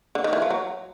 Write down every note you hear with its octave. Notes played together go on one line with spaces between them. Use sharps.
D3
D#3
E3
F3
F#3